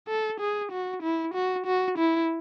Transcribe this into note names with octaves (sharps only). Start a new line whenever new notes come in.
A4
G#4
F#4
E4
F#4
F#4
E4